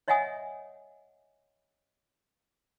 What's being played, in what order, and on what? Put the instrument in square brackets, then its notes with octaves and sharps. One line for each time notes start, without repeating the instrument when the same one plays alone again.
[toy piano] C#5 D#5 E5 F#5 G#5 D#6